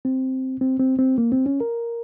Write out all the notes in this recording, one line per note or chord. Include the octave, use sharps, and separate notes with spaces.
C4
C4
C4
C4
A#3
C4
C#4
A#4